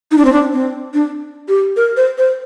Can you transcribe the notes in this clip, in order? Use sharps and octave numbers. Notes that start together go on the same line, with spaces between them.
D#4
D4
C4
D4
C4
D4
G4
A#4
C5
C5